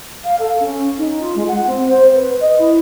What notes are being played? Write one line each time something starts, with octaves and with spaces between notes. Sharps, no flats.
F5
A4
C#4
D#4
F4
G#3
F#5
C4
C5
B4
D#5
E4